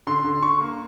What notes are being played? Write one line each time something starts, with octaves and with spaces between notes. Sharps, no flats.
D3 C6
D3
D3 C#6
A#3